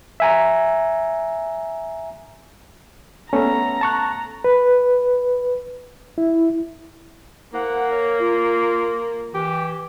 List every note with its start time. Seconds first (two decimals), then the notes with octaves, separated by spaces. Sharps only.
0.20 E5 G#5 A#5
3.33 A3 B3 C#4 A4 A#5
3.81 A5 C#6 F#6
4.44 B4
6.18 E4
7.53 A#3 E4 C5 F#5
7.90 A#4 C#5
8.20 F4
9.34 E3 G4